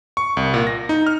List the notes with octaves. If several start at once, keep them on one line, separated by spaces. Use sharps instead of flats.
C#6
C2
A#2
A#6
D#4
F6